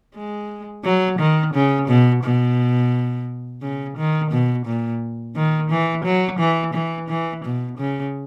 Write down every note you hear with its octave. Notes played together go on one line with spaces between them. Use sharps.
G#3
F#3
D#3
C#3
B2
B2
C#3
D#3
B2
A#2
D#3
E3
F#3
E3
E3
E3
B2
C#3